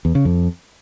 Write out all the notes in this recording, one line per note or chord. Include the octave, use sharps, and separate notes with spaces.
E2
C#3
F2